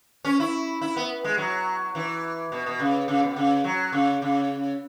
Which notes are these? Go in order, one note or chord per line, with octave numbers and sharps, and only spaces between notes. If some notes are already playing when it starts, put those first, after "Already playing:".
C#4
E4
E4
B3
G#3
F#3
E3
B2
B2
C#3
C#3
B2
C#3
F#3
C#3
C#3